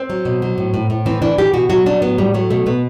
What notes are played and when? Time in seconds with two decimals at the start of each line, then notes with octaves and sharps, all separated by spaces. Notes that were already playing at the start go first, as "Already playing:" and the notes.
Already playing: C4
0.10 F#3
0.25 B2
0.42 F#3
0.58 A2
0.74 A2
0.90 A2
1.06 E3 C4
1.22 E3 D4
1.38 E3 G4
1.53 B2 F#4
1.70 F#3 F#4
1.86 F#3 D4
2.02 A2 B3
2.18 A2 G3
2.34 F#3 A3
2.50 B2 A3
2.66 B2 B3